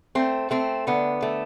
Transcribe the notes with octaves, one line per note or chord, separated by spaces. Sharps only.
A3 C4
A3 C4
D3 B3
A3